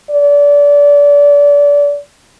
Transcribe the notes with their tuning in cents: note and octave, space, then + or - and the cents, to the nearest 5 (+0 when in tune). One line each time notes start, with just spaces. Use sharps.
D5 -30